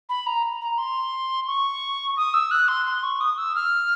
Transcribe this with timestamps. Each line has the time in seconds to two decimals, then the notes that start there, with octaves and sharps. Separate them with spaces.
0.09 B5
0.26 A#5
0.61 A#5
0.78 C6
1.47 C#6
2.16 D#6
2.33 E6
2.51 F#6
2.68 C6
2.86 C6
3.03 C#6
3.20 D#6
3.37 E6
3.55 F6